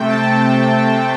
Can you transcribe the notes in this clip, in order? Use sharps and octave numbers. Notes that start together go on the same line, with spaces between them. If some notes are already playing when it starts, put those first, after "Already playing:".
Already playing: C3 A3 C4 G5
A5